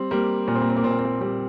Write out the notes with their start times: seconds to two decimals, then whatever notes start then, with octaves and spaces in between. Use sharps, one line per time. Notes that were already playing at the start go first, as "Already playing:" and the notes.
Already playing: G3 C4
0.11 G3 A#3
0.48 A#2 A#3
0.55 C4
0.62 A#3
0.70 C4
0.77 A#3
0.84 A#2 C4
0.91 A#3
0.99 C4
1.05 A#3
1.21 G3 C4